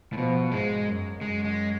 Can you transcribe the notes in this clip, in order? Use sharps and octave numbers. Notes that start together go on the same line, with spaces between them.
A2
B2 F3
G#2 G#3
F#2
F#2 G#3
G#3